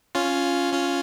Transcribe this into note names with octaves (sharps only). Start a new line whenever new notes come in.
C#4 F4
C#4 F4